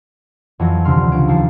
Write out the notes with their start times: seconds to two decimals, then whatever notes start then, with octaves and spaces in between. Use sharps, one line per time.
0.59 F2 E3 F#3
0.85 D#1 D2 C3 G3 C6 F6
1.12 C#2 F4 D7
1.28 D#2 F3 A5 C7